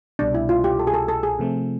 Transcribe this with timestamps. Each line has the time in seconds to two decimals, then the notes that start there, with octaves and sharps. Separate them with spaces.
0.19 C2 B2 G3 D4
0.34 E4
0.49 F4
0.64 G4
0.79 A4
0.87 G#4
0.94 A4
1.09 A4
1.23 G#4
1.39 C3 F3 A3 C4